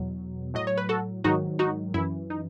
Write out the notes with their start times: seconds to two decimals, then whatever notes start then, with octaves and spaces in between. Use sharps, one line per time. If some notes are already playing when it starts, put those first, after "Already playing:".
Already playing: E2 B2 F#3
0.54 A2 F#3 D#5
0.67 C#5
0.78 B4
0.89 F#4 A4
1.24 G#2 D#3 F#3 D#4 F#4
1.59 D#4 F#4
1.94 F#2 E3 E4
2.30 D#4